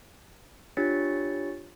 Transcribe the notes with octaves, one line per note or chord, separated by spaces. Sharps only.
D4 F4 G4 C#5 A6 C#7